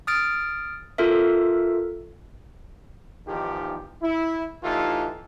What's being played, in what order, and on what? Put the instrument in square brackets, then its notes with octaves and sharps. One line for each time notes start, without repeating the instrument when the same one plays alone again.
[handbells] D#6 F6 A6 D7
F4 A4 A#4 E5
[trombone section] E2 G#2 D#3 F3 G4
E4
A2 E3 D#4 F4 G4 A4